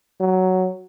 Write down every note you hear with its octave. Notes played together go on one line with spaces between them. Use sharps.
F#3